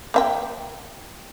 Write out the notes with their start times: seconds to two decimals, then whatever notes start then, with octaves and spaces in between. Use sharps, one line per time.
0.14 A#3 E5 G5